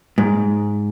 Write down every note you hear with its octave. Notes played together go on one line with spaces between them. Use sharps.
G#2